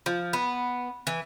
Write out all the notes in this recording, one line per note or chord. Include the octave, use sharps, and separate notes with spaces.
F3
B3
E3